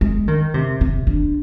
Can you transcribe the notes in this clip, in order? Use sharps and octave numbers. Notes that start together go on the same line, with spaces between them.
G#3
D#3
C3
C3
D3